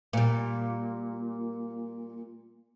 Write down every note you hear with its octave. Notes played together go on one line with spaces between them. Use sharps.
A#2 G3